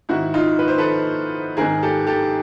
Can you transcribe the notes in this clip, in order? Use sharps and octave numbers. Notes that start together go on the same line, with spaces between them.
G#2 D#3 E4 F#4
D#4 F4
B4
C5
A4 B4
G#2 D#3 G#4 A#4
G4 A4
G4 A4